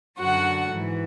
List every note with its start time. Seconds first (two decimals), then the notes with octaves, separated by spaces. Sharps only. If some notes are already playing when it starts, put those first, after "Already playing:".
0.18 F#2 D3 F#4 F#5
0.70 G#2 E3